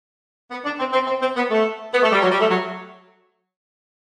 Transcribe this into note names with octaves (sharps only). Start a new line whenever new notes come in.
B3
D4
C4
C4
C4
C4
B3
A3
B3
A3
G3
F#3
G3
A3
F#3